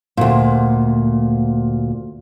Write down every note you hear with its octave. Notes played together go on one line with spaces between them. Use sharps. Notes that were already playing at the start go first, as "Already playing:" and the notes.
D2 A#2